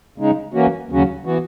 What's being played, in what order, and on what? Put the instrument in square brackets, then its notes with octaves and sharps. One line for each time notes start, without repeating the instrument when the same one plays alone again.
[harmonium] C#3 G#3 D#4
E3 A#3 C#4 F#4
D#2 C#3 F#3 C#4 F#4
E3 B3 F#4